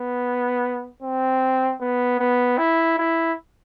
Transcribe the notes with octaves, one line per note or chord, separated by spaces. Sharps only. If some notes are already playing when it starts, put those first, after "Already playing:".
Already playing: B3
C4
B3
B3
E4
E4